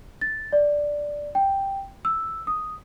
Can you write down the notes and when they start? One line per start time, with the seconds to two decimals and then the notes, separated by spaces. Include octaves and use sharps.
0.21 A6
0.52 D5
1.35 G5
2.05 E6
2.47 D#6